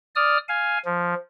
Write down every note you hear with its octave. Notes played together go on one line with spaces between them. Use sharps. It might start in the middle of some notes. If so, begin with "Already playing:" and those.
D5 D#6 F6
F5 G#5
F3